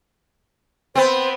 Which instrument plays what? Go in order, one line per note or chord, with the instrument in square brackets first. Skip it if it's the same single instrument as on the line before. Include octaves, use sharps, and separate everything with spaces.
[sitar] B3 C4 [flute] C5